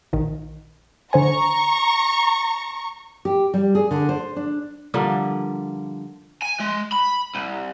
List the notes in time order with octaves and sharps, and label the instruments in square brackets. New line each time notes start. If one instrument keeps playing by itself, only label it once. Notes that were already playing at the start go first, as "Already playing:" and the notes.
[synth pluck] A#1 D#3
[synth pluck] D3 C5 G#5 [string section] A#5 C#6
[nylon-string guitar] G4
G3
G#4
D3
C5
D4
[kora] D3 F3 G3 A#3
[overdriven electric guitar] G#5
G#3
B5
C2